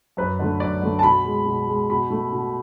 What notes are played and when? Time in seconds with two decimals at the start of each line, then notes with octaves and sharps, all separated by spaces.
0.17 F#2 B4
0.39 D3 A3
0.60 F#2 D5
0.82 D3 A3
0.99 A5
1.03 B2 B5
1.25 G#3
1.46 B2
1.68 G#3
1.90 B2 B5
2.11 A3
2.33 B2